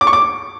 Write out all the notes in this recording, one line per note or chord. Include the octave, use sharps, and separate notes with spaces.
D6
C#6
D6